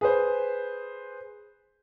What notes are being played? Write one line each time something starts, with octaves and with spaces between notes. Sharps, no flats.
G#4 B4 C5